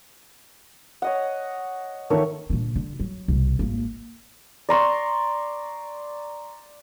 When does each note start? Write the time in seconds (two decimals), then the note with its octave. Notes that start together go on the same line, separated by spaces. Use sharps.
1.02 C#5 D#5 F#5
2.10 D#3 A3 A#4 C#5
2.50 A#2 D3
2.76 D3
3.00 F#3
3.28 C2 B2
3.59 G#1 A#3
4.69 D5 A#5 C6 C#6